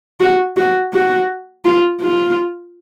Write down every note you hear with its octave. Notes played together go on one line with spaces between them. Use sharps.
F#4
F#4
F#4
F4
F4